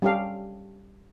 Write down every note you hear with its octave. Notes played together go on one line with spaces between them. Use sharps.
G3 C#4 G4 A4 F5